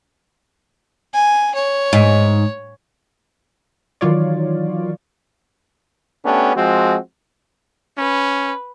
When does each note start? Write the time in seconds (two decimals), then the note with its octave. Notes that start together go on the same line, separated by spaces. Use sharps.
1.13 G#5
1.55 C#5
1.93 G#2
4.01 D#3 E3 F#3 F4 C#5 D5
6.25 A3 B3 C#4 D4 G4
6.56 F3 G#3 C4 F#4
7.98 C#4 B4